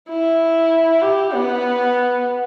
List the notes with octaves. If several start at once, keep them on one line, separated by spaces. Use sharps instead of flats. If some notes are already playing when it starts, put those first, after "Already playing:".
E4
G4
B3